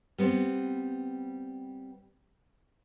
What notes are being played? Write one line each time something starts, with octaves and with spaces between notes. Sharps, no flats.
G3 B3 C4